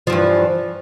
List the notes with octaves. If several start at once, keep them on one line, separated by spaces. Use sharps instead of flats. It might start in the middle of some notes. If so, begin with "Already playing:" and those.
G2 E3 F3